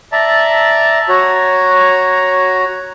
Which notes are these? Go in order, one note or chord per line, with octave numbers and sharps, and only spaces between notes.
D5 E5 A5 A#5
F#4 C#5 A#5